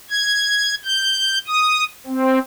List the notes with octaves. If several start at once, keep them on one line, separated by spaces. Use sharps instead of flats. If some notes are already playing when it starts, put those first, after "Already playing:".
G#6
G6
D#6
C4